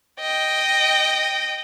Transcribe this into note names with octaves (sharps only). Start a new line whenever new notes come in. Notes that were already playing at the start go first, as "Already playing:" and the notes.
D#5 G5